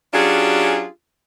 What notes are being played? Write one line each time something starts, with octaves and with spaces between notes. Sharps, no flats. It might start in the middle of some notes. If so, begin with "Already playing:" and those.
F#3 C#4 D4 F4 G4 G#4